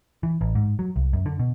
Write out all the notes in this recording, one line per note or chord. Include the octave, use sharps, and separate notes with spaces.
E3
A1
G#2
F#3
C2
F#2
D3
B2